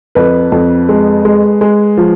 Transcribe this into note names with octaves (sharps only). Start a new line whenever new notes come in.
F2 B4
F2
G#3
G#3
G#3
F3